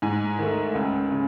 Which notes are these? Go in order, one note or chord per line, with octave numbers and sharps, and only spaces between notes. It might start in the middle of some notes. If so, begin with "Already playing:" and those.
G#2 G#5
D#3 A3
C#2
C#3